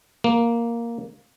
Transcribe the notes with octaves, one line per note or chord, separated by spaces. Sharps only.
A#3